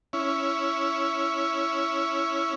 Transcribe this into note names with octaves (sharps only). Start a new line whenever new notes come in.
C#4 E4